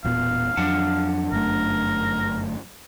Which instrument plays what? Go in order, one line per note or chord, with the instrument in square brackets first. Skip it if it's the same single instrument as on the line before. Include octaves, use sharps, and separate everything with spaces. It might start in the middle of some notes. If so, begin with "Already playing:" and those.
[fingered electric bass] E1 A#2 B3 [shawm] F5
[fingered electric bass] F2 F#3 [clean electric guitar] D4 F#5 A5
[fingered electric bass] G1 F#2 A3 [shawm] A#4